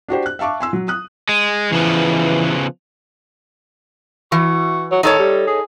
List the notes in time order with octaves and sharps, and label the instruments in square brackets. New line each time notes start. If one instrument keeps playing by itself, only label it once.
[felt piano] D4 F#4 G4 C5
F#6
E5 F5 A5 C#6 D6
G#5 C6 E6
F#3
D#6 F#6
[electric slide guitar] G#3
[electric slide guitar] C#3 F3 B3 [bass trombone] E3
[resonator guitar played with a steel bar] E3 [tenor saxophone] F#4
[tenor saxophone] F#3
[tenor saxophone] D#3 [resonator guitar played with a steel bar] D#4 A4 C#5
[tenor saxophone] G3
G#4